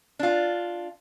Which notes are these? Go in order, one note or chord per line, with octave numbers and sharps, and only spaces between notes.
D4 F4